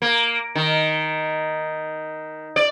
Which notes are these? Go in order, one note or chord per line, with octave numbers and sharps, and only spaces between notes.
A#3
D#3
D5